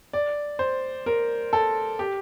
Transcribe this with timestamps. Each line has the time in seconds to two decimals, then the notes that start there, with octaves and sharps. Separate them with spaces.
0.13 D5
0.59 C5
1.06 A#4
1.53 A4
1.99 G4